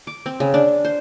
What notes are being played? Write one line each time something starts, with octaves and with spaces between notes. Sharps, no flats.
D6
C4
C#3
D4
C5